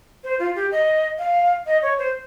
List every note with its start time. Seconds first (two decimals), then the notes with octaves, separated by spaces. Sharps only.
0.24 C5
0.39 F4
0.56 G4
0.71 D#5
1.19 F5
1.66 D#5
1.82 C#5
1.99 C5